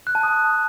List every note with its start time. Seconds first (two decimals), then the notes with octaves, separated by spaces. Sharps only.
0.07 F#6
0.15 A5
0.23 D#6